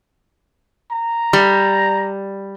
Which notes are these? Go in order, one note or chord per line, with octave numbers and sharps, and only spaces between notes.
A#5
G3